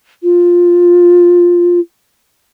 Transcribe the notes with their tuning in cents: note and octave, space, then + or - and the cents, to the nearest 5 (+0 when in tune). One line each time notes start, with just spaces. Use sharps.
F4 +5